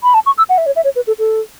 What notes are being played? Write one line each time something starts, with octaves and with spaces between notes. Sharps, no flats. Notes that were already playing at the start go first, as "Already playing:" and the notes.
B5
A5
C#6
E6
F#5
E5
C#5
E5
C#5
B4
A4
A4